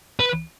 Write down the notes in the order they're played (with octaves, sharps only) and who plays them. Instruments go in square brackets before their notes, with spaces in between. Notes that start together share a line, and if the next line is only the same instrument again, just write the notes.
[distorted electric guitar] B4